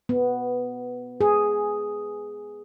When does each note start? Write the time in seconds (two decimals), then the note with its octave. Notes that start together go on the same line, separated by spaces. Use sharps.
0.09 B3
1.21 G#4